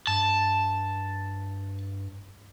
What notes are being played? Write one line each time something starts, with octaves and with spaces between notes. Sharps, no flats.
G2 A5